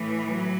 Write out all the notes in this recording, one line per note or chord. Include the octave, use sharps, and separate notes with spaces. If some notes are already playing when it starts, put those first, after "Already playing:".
Already playing: A2 E3
F#3